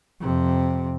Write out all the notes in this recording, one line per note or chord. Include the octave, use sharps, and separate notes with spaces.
F2 C3